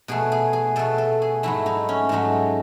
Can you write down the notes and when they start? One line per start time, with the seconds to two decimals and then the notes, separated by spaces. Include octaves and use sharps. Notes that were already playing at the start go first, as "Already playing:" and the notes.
0.08 B2 A3 G#4
0.32 G#4
0.53 G#4
0.76 B2 A3 A4
0.98 A4
1.22 G#4
1.43 G#2 F#3 A3 E4
1.66 D#4
1.89 C#4
2.09 G#2 F#3 A3 D#4